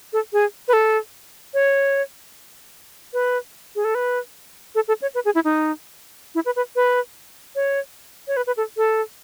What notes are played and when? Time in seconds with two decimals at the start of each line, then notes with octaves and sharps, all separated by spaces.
0.13 A4
0.33 G#4
0.68 B4
0.73 A4
1.54 C#5
3.13 B4
3.75 G#4
3.85 A4
3.95 B4
4.75 A4
4.88 A4
5.02 C#5
5.15 B4
5.25 G#4
5.35 E4
5.44 D#4
6.35 E4
6.46 B4
6.56 B4
6.76 B4
7.55 C#5
8.28 C#5
8.37 B4
8.47 B4
8.57 A4
8.77 A4